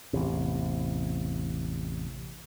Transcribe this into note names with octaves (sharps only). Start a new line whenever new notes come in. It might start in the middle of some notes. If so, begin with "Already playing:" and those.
A1 E2 C3